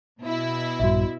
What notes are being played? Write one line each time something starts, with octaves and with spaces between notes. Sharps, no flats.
B2 E4
A#1 G2 F#4 E5